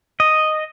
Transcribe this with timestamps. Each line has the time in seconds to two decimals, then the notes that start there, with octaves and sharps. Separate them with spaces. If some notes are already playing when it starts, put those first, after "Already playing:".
0.20 D#5